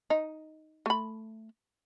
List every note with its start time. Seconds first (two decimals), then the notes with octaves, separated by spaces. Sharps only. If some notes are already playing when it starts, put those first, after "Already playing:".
0.10 D#4
0.86 A3 B5